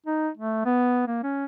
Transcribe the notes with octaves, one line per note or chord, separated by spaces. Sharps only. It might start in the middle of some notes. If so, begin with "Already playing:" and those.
D#4
A3
B3
A#3
C#4